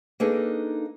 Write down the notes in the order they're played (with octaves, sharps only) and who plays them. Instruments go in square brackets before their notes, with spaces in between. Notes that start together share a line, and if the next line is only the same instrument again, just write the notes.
[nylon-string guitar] A#3 D4 D#4 G#4 A4 B4